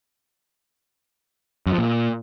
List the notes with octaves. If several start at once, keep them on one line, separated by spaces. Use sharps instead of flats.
F#2
F3
A#2